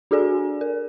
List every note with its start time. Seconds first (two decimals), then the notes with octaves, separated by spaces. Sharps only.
0.11 D4 F#4 G#4 A4 D5 G#5
0.61 A#4